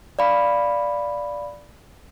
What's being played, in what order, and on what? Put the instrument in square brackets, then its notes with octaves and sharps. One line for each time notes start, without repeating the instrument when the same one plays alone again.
[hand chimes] D5 F5 B5